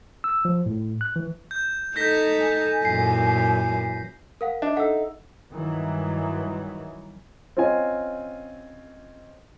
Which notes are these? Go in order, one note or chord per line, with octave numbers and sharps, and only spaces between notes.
E6
F3
A2
F#6
E3
G6
D#4 A4 G6 A#6 B6
G#5
F#2 A#2 E3 C7
A#4 F5 F#5
D4 D#5 E5
D#4 A4 F#5 E6
G2 D#3 E3 F#3
C4 C#4 F4 D#5 G#5